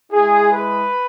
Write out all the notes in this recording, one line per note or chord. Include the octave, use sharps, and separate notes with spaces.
G#3 E4 G#4
B4